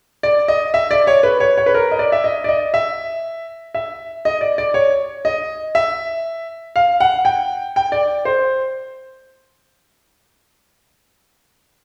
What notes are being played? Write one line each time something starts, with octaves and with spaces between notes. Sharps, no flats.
D5
D#5
E5
D5
C#5
B4
C#5
C#5
B4
A#4
D#5
D5
E5
D#5
D5
D#5
E5
E5
D#5
D5
D5
C#5
D#5
E5
F5
F#5
G5
G5
D5
C5